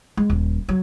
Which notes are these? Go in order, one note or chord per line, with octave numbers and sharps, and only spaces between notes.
G#3
D#1
F#3